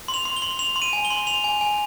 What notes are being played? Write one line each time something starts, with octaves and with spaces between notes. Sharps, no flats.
C6
F7
C6
G7
C6
C6 F7
C6
D#7
G#5
G7
C6
C6 F7
G#5
G#5